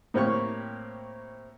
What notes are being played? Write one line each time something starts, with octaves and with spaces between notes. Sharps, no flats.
A2 A#3 C4 G4 C#5 C#6